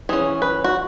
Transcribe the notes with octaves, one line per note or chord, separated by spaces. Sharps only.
E3 C#4 G#4
B4
F#4